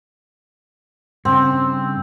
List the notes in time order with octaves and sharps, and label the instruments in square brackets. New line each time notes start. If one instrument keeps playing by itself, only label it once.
[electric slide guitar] G2 C#3 [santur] C4